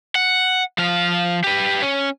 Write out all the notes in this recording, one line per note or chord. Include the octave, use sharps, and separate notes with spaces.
F#5
F3 F5
G4 B4
C#4